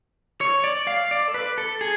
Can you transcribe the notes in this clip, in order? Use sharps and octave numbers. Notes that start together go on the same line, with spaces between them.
C#5
D5
F5
D5
A4
B4
A4
G#4